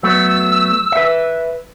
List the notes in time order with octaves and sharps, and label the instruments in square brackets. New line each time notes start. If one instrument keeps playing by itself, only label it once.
[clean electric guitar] F#3 A3 B3 [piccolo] E6
[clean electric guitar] B4 E5